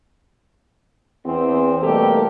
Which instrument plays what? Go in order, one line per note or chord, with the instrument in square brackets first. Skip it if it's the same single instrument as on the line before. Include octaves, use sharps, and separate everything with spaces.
[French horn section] E2 C4
B2 G3 A3 A#3 G4 A4